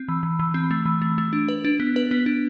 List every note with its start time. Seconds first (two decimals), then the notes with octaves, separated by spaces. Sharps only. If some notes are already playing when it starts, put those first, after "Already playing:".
Already playing: C4
0.08 E3
0.23 E3
0.39 E3
0.54 C4
0.71 A3
0.86 E3
1.02 A3
1.18 A3
1.33 D4
1.48 B4
1.65 D4
1.80 B3
1.96 B4
2.11 B3
2.26 D4